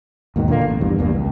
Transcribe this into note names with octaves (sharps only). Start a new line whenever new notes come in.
D#2 G#2 B2 D#3
A#2 D3 E3 A#3
A1
E2 G2
G1 E2 G2 A#3
C#2